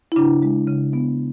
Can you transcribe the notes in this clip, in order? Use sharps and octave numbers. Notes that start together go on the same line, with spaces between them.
E4
C#3 D4
G#3
C#3
B3